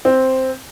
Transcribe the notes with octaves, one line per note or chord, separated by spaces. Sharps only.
C4